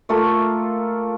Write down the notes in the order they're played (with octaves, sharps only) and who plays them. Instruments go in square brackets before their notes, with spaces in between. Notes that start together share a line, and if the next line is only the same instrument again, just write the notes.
[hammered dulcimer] A3 A#3 F4 A4